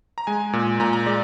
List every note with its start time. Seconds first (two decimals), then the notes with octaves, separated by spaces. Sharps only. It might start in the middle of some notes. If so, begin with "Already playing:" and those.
0.18 A#5
0.27 G#3 G#5
0.53 A#2
0.80 A#2 A#5
0.93 A#5
1.06 G#3 D5